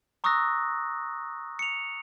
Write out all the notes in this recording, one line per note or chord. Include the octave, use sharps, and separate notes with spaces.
A#5 C#6 D#6 E6 F#6 A#6
C#7 F7